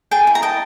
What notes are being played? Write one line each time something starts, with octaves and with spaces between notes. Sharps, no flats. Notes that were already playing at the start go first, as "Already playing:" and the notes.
G#4 G5 A5
E4
A#5
D#5 G5 A5